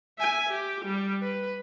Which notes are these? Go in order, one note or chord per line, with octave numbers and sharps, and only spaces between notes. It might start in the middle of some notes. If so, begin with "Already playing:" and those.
E5 G#5
G4
G3
B4